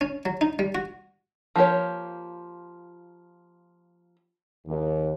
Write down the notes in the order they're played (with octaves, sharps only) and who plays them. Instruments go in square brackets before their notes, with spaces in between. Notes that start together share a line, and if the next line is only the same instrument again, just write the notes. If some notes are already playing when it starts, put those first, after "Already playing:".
[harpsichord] C#4
F#3
D#4
G3
F#4
[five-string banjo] F3 A#3 G4 C#5
[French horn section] D#2